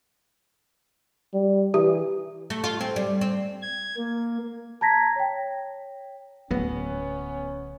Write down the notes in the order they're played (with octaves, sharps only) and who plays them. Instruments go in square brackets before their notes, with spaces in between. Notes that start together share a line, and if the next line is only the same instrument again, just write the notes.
[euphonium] G3
[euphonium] E3 [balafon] G4
[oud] A3
F4
C4
G3
C4
[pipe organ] G#6
A#3
[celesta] A5 A#5 G#6 A#6 B6
C#5 G5
[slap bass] D1 F#3 [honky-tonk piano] B3 [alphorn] C#4